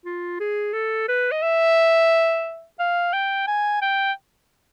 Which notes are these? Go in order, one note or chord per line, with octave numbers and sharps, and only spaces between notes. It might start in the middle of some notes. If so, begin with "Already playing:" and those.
F4
G#4
A4
B4
D#5
E5
F5
G5
G#5
G5